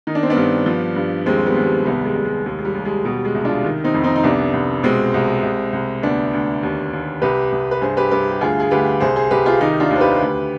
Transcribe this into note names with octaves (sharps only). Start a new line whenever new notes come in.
D#3 D#4
D4
C4
B3 D4
G2
F3
G2
D#2 G#3 C4
G3 B3
D#2
G3
C2 G3 B3
G#3
C2
G#3
D#2 G#3
G#3
G3
D#2
G#3
B2 G3
G#3
C2
D4 F4
D#3
C4 D#4
F2
C4 D#4
D#4
C2 B3 D4
C2
B2 G#3 C4
C2
C2
C2
D2 B3 D4
D2
D#2
D#2
C2 G4 B4
C2
B4
G2 G#4 C5
G4 B4
G2 G4 B4
G4
D2 F4 G#4
G#4
D2 G4 B4
C2 G#4 C5
G#4 C5
C2 G4 B4
F4 G#4
D#3 D#4 G4
D4 F4
D#2
C5
G4 B4
D2